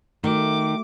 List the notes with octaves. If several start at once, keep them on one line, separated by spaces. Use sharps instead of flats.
D#3 A3 F#4 D6